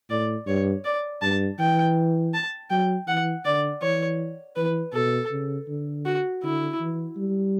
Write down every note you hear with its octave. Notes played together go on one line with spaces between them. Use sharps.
A2 D5
G2 C#5
D5
G2 A5
E3 G5
A5
F#3 G5
E3 F#5
D3 D5
E3 C#5
E3 B4
B2 A4
C#3
D3
F#4
D3 E4
E3
G3